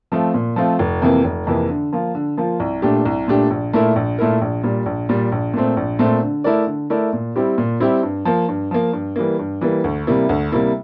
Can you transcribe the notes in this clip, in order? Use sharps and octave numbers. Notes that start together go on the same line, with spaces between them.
F3 A3 C4 F4
A#2
F3 A3 C4 F4
F1
F2 C3 E3 A#3
F1
F2 C3 E3 A#3
D3
F3 A#3 F4
D3
F3 A#3 F4
C2
A#2 A3 D4 G4
C2
A#2 A3 D4 G4
A#1
A#2 A3 E4 A#4
A#1
A#2 A3 E4 A#4
A#1
A#2 G3
A#1
A#2 G3
A#1
A#2 A3 C4
A#1
A#2 A3 C4
D3
A3 E4 A#4 D5
D3
A3 E4 A#4 D5
A#2
G3 C4 E4 G4
A#2
G3 C4 E4 G4
G2
F3 A#3
G2
F3 A#3
G2
E3 G3 A#3
G2
E3 G3 A#3
D2
C3 G3 A#3 E4
D2
C3 G3 A#3 E4